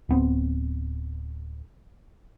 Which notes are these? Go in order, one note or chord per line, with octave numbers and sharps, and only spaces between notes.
D1 B3 C4